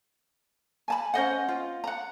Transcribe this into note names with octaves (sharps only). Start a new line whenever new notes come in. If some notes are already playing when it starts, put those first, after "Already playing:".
G#5 A5 B5
C#4 C5 D#5 F#5
F4
F#5 A#5